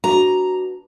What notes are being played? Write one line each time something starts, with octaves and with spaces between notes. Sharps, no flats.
D4 F#4 B4 A#5